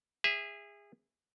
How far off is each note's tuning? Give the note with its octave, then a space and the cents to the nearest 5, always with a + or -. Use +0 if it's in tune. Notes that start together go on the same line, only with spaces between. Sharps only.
G#4 -25 E5 +0